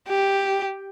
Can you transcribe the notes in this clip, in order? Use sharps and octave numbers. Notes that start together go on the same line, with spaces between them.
G4